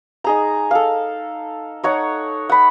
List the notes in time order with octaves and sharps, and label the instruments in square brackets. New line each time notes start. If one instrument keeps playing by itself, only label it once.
[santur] D#4 G#4 A#5
A4 F5
D#4 C#5 F#5
F#5 B5